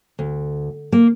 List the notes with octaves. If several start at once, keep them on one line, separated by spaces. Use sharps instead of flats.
D2
A#3